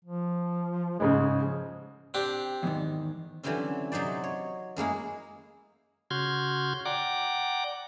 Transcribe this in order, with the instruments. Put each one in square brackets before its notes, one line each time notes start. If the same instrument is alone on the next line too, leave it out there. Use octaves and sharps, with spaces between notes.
[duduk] F3
[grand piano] G#2 C#3 G#3 [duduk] G#4
[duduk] F3
[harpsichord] C4 D4 G4
[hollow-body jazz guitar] E2 G#2 D#3
[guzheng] D3 E3 F#3 G3 C4 C#4
C3 F#3 D#4 C5 D5
C#5
F#2 G#3 A#3 E4
[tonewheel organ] C#3 F#4 C6 F6 G6 G#6
D5 F#5 G5 A#5 D6